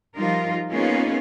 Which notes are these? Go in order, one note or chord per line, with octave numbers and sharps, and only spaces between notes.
F3 G3 D#4 F4 A#4
A#3 B3 C#4 D#4 F4 G#4